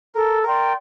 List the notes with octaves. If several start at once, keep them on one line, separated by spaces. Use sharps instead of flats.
A4 A#4
A#4 D5 G5 C6